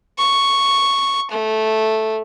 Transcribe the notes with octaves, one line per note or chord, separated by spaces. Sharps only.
C#6
A3